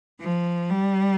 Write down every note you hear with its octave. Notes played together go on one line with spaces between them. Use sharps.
F3
G3